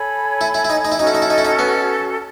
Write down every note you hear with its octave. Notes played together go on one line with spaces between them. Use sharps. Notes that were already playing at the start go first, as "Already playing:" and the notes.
Already playing: A4 C#5 G#5 B5
E4
E4
E4
D#4
D#4
E4
C#4 D#4 F#4 A4
E4
D#4
E4
D#4
E4
D#4
B3